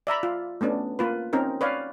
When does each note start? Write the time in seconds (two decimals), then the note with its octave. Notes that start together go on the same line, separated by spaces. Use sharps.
0.07 D5 E5 A#5 B5
0.23 F4
0.61 A3 B3 C#4 D4
0.99 A#3 F4 B4
1.33 C4 C#4 D#4 A#4
1.61 B4 C#5 D5 F5